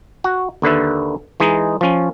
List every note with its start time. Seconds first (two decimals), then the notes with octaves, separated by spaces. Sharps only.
0.24 F#4
0.62 D#2 D3 B4 E5
1.40 E3 G#3 D#4
1.81 F3 C#4